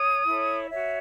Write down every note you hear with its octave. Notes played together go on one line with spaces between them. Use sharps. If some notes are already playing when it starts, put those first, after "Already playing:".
Already playing: C#5 D#6
E4 A4 C#5
F#4 C#5 E5